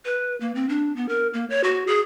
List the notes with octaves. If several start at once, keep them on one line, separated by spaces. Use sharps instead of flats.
B4
A#3
C4
D4
B3
A#4
A#3
C#5
F#4
G#4